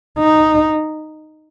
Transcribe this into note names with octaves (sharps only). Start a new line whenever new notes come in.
D#4